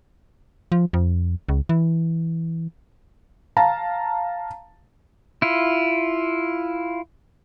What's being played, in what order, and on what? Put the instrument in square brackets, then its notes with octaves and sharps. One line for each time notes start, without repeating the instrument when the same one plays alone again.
[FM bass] F3
F2
C#2
E3
[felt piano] F5 A5 A#5
[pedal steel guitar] E4 F4